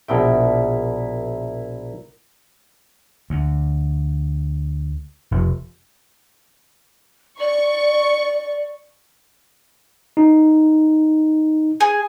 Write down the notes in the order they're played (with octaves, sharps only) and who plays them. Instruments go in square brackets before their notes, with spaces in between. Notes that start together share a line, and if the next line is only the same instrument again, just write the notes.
[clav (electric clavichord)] A#1 B2 G5 [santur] E4 A#4 E5
[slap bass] D2
F1
[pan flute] D5 [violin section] C#6
[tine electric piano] D#4
[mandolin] G#4